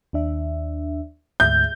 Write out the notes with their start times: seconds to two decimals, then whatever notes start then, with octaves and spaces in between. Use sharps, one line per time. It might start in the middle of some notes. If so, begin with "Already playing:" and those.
0.13 D#2 D4 E5
1.40 D2 G#2 E5 G6